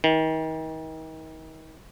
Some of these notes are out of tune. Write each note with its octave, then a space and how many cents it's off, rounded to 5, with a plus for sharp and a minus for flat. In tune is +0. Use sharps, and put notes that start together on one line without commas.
D#3 +35